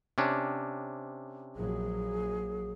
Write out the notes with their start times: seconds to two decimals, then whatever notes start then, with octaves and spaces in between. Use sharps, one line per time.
0.18 C3 C#4 D4
1.56 A#1 F#3 G#4